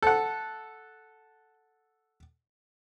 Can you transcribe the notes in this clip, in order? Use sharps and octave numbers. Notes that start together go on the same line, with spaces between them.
A4 F#5